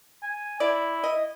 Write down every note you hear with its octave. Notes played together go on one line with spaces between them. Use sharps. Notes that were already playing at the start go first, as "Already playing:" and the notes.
G#5
E4 D5
D#5